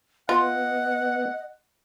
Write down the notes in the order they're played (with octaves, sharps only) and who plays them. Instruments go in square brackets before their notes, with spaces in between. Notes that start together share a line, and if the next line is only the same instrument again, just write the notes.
[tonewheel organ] B3 [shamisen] F4 [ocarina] D#5 [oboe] F#5